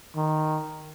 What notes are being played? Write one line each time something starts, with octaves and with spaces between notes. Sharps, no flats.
D#3